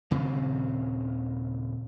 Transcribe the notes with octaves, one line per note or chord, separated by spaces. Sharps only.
D#1 C#3 C4